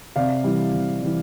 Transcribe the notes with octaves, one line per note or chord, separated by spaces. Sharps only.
C3 D5 F5
E3 G3
C3
E3 G3